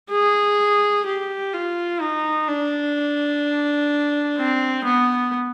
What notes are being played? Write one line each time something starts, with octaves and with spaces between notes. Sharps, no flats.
G#4
G4
F4
D#4
D4
C4
B3